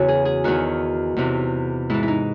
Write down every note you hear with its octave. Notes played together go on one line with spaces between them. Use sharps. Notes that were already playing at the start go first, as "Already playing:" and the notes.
Already playing: E2 C#3 E3 F#4
G#4
G#4
E2 D#3 F#4
E2 C3 E3
G#2 E3 E4
E4
D#4